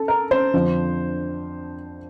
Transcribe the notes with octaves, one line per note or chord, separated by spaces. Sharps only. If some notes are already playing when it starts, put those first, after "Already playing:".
Already playing: A4
A#4
C5
F2 D3 F3